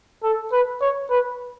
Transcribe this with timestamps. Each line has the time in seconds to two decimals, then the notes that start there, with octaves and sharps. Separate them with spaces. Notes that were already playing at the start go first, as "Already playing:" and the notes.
0.24 A4
0.52 B4
0.81 C#5
1.10 B4